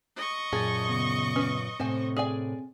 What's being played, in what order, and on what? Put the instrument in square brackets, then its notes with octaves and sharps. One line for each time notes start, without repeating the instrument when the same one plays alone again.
[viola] D#5 C#6
[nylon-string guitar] F#2 A#2 [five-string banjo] G#4 [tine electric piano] A5 A6
[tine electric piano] C#3 B3
[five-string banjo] C#4 B4
[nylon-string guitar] A2 C3 [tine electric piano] C4 [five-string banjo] C5 G#5
[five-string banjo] G#4 D5 G#5